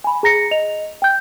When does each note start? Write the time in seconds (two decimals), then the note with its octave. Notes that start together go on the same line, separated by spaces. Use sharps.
0.04 G#5 B5
0.23 G#4 A#5 A#6 C#7
0.51 D#5 F7
1.02 G5 G6